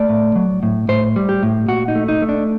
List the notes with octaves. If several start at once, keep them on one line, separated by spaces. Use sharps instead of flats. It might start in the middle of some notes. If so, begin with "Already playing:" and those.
Already playing: A3 D5
A2
F#3
A2
A2 C5
G3
G4
A2
A#2 F#4
D#4
A3
D#4
A3
D4